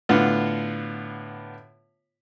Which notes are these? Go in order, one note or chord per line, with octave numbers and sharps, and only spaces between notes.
A2 D3 B3 F4